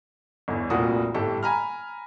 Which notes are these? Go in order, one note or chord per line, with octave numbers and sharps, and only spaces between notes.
G1 E2
F1 C2 A#2 F4 F#4 D#6
G1 A2 G4 A4
G#5 A#5 B5 F6